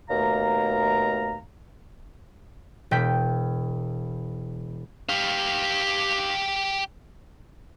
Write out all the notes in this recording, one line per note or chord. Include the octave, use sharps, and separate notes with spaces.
D#2 B2 A3 F5 A#5
E1 G5 G6 B6
G4 F5